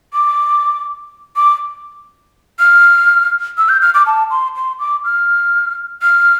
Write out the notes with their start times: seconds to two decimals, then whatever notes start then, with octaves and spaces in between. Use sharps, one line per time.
0.13 D6
1.36 D6
2.60 F6
3.58 E6
3.69 G6
3.82 F6
3.94 D6
4.06 A5
4.31 C6
4.56 C6
4.79 D6
5.05 F6
6.02 F6